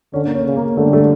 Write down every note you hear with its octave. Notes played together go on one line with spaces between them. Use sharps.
D3 C#4
A#3
C#4
C#3
A#3
D3 A3
G3
A3